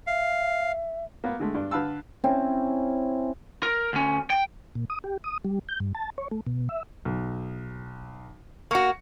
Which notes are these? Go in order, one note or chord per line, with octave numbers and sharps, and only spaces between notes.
E5 F5
A#3 B3
D3 G#3 A3
G2 D4
D3 B4 F5 A5 E6
C4 C#4 E4
A#4
D2 C#4
G5
A#2
D#6
G4
D#6
G3
G6
G2
A5
C#5
A3
B2
E5
B1
A#3 F#4 C#6 C#7